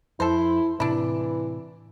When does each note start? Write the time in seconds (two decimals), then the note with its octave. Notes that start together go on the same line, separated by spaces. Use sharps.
0.20 F2 E4 A4 C5
0.80 A2 C3 E3 D4 E4